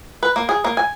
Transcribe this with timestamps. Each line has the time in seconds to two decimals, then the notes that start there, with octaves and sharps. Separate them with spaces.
0.23 B4
0.36 A#3
0.49 G#4
0.65 A#3
0.77 G#5